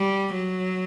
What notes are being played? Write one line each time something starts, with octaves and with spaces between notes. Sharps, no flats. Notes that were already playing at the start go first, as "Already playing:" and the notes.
Already playing: G3
F#3